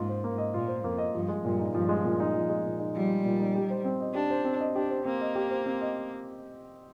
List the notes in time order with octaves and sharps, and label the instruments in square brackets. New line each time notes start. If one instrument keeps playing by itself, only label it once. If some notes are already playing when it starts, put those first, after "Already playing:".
Already playing: [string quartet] G#2 [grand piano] A#3 F4 D#5
[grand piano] C5
A#3
D#5
[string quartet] A#2 [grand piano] F4
[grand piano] C5
[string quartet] F2 [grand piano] A#3
[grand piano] D#5
[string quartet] G2 [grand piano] F3
[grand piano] G#3
[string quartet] G2 [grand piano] A#2
[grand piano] D#4
[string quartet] G2 [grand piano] F3
[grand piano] G#3
A#2
D#4
F3
G#3
A#2
D#4
[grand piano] F3 [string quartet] G3
[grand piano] G#3
A#2
D#4
G4
C5
C4
D#5
[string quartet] D4 [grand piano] G4
[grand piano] C5
C4
D#5
[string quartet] D4 [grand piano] G4
[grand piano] C5
[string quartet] A#3 [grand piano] C4
[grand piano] D#5
G4
C5
C4
D#5